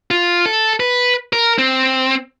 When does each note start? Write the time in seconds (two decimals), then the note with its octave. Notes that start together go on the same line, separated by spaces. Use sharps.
0.11 F4
0.46 A4
0.80 B4
1.33 A#4
1.58 C4